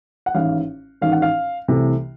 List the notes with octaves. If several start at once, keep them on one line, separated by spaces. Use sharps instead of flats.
F#5
A1 G#2 D#3 F5
A1 G#2 D#3 F5
F#5
F5
C2 C3 E3 A3